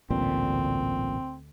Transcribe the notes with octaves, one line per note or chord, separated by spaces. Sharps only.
A1 D2 G2 A#2 C4